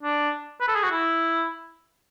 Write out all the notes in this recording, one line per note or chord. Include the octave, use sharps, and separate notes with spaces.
D4
B4
A4
G#4
F#4
E4